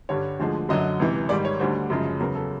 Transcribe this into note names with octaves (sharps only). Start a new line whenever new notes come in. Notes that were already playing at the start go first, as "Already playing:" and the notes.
G2 D3 G3 C#5
D2 D3 F3 G#3
F#2 D3 F#3 D#5
C#2 C3 E3
G#2 D#3 G3 D5
C#5
D2 D3 G3 C5
F#2 C#3 F3 G#3
E2 C#3 F#3 A#4
A4